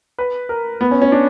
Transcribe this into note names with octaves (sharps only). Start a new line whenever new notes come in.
B4
A#4
B3
C#4
C#4
D4